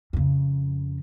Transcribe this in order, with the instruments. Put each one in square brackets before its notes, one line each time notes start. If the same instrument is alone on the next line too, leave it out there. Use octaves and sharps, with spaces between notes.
[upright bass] F2 C#3